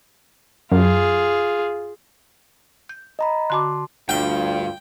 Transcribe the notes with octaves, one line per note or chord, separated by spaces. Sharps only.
F#2 F4 G#4
G6
D#5 A#5 B5
D3 F#4 A5 C6 D6
D2 G2 F4 G5